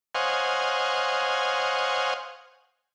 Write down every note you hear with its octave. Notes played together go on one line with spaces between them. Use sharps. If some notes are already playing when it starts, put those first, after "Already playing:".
C5 C#5 D#5 F5 F#5 G#5